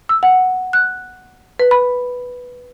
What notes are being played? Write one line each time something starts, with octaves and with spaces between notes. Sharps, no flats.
E6
F#5
F#6
B4
B5